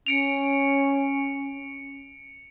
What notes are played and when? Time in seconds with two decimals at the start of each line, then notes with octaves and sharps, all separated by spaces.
0.07 C#4 C#7 D7 F7